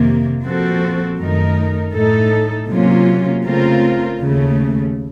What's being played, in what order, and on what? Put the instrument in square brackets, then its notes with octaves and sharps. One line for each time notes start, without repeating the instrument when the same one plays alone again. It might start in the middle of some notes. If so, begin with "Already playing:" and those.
Already playing: [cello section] F2 C3 D#3 A#3
A#2 F3 C4 F#4 A4
F#2 D#3 A3 D#4 A#4
A2 A3 D#4 A4
C3 F#3 A#3 C#4 F4
C#3 A3 C4 F4 A#4
D#2 C#3 A3